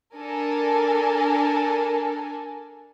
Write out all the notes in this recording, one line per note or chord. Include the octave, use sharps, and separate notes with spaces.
D4 A4 A#4 G#5